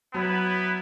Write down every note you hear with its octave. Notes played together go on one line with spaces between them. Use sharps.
F#3 B3 E4 B4